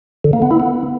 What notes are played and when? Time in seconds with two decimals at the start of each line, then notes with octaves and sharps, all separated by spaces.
0.24 D3
0.33 A#3
0.42 B3
0.51 E4
0.60 B3